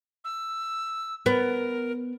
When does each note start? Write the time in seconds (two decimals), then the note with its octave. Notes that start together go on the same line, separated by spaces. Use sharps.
0.25 E6
1.26 B3 A#4